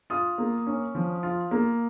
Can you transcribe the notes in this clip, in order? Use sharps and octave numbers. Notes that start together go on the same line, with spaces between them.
F4 D#6
A#3
C#4
F3
F4
A#3